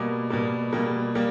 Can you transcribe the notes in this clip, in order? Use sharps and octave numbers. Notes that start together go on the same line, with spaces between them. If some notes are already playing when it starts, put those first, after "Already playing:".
Already playing: B2 G3 A#3 D6
B2 G3 A#3
B2 G3 A#3
G3 A#3